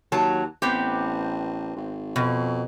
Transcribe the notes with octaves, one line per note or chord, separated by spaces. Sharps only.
D#2 F#3 A5
A1 B3 C4 G4
G#1
F2 B2